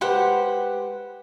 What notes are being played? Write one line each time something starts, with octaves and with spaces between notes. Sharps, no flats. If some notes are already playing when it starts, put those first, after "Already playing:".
G#3 G4 B4 C5 F#5